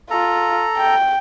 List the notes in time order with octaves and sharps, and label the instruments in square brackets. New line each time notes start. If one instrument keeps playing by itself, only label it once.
[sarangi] F4 [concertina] A4 A#5
[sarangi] G5